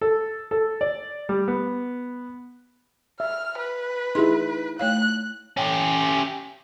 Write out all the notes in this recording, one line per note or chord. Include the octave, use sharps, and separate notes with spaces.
A4
A4
D5
G3
B3
E5 F6
B4
D#4 E4 G4 G#4 C6
A3 C#5 F5 F#6
C#4 G4